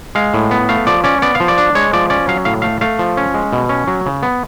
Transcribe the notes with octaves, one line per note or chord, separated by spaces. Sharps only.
G#3 F5
A2
B3
A3 F5
F3 D5
C#4 D5
B3 D5
F5
F3
D5
D4
G#3 C#5
F3 D5
C#4 D5
F#3 F5
A2 F5
A3 F5
A3 F5
F3
C#4
G#3
B2
C#4
F#3
C#3
B3